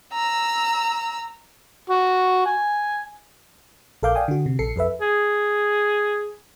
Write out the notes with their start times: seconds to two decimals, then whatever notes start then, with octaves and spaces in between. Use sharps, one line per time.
0.13 A#5 E6
1.90 F#4
2.46 G#5
4.03 A#1 A4 A#4 F5 D6 G6
4.15 D5 F5 G5 G#5 D#6
4.28 D3 F#4
4.46 C3
4.59 A#1 A4 C7 C#7
4.76 F2 A4 B4 E5
5.02 G#4